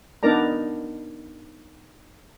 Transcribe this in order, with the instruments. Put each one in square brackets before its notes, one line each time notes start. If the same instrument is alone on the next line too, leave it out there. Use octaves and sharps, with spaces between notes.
[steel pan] B3 D4 D#4 A#4 D5 A#5